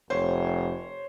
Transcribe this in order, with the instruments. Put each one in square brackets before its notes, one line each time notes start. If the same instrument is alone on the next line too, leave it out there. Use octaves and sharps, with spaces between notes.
[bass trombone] F1 [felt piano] C5 C#5